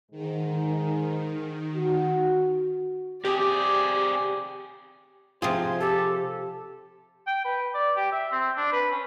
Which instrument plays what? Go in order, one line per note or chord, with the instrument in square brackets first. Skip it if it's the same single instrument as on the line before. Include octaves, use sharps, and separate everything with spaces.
[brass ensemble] G#2 [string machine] D#3
[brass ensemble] F#4
[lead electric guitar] C3 G#4 [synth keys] G4 [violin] D5
[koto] C3 F3 G#4 [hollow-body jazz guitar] F4 [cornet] C5
[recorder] G4 [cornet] A4
[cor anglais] G5
B4
D5
G4
E5
C4
D4
B4
C#4